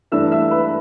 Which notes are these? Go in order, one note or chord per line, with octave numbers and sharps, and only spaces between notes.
G2 E3 A3 D4 E5 E6
E5 E6
B4 B5